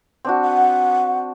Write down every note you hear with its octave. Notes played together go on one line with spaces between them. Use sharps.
C4 D4 F#4
F#5